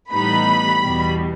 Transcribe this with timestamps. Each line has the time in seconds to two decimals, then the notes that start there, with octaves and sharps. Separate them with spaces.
0.12 A2 E3 G3 B3 D#4 B5
0.81 E2 B2 G3